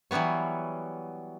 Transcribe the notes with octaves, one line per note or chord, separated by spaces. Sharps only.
E3 F#3 G3 B3 C#5